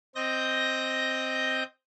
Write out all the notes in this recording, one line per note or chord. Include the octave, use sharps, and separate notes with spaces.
C4 D#5 G6 A#6